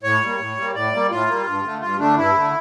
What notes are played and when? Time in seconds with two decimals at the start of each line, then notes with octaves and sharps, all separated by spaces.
0.03 A2 C#5
0.22 G3 A#3
0.39 A2
0.57 G3 A#3
0.75 A2 D5
0.93 G3 A#3
1.11 A2 F4
1.28 G3 A#3
1.46 G2
1.63 D3 A3
1.81 G2 F4
1.99 D3 A3 D4
2.17 G2 E4
2.35 D3 A3